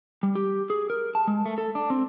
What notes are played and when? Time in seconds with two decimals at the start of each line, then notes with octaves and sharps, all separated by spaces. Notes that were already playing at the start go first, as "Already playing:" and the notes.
0.23 G3
0.35 G4
0.70 G#4
0.90 A#4
1.15 A5
1.27 G#3
1.46 A3
1.58 A4
1.75 D4
1.90 C4